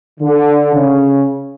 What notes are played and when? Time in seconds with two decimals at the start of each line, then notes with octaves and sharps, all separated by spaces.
0.20 D3
0.74 C#3